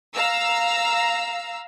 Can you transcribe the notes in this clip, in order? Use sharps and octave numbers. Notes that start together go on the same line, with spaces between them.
F5 A#5 E6